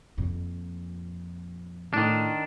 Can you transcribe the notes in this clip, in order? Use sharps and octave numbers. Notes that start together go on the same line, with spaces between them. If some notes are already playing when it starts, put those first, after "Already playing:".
F2 A#2
A2 D#3 D4